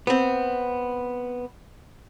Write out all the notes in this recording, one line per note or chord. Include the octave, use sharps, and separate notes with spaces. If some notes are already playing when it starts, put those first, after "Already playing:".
B3 C4